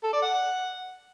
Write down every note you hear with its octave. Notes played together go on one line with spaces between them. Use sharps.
A4
D5
F#5